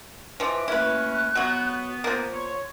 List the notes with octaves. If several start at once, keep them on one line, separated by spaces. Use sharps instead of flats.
E3 F3 B4 D#5 D6
A3 A#3 C#4 E4 B4 F#6
F#3 B3 F#4
F3 A#3
C#5 C6